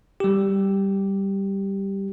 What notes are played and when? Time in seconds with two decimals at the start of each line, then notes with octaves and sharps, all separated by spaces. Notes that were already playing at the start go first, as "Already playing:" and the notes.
0.20 G3 G4